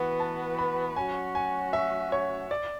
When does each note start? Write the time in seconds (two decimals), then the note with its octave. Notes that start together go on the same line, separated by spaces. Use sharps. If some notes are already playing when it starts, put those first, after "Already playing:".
Already playing: E3 B3 F#4 B4 F#5
0.20 A5
0.59 B5
0.96 F#3 C#4 F#4 G#5
1.35 G#5
1.73 E5
2.12 C#5
2.51 D5